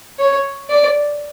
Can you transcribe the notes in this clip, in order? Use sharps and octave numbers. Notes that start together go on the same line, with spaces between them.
C#5
D5